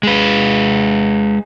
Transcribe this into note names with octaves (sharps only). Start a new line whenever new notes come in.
G#3 B4